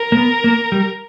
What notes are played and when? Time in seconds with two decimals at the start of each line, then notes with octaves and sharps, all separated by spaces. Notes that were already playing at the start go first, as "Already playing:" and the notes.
Already playing: A#4
0.12 A#3
0.17 B3
0.44 A#3
0.72 G3